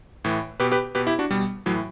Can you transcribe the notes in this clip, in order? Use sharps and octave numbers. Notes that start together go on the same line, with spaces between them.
A2 E3
B2 G4 B4
G4 B4
B2 G4 B4
E4 G4
D4 F#4
B2 G3
A2 E3 F#3